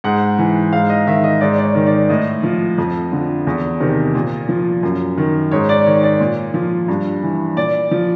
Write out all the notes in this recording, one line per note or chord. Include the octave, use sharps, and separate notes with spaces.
G#2 F#5
E3
G#2 F5
D#5
D#3 E5
D#5
G#2 D5
D5
C#5
D#3
D5
A2 D#5
F3
F2
D3 F3
E2
C3 D#3
A#2
F3
F#2
D#3
G#2 C#5
D5
D#3 C#5
D5
A#2
F3
G2
E3
A#2 D5
F3